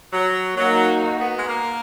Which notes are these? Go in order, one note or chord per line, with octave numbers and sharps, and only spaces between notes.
F#3
F#3 A#3 D#4 F#4
B3
G#3
A#3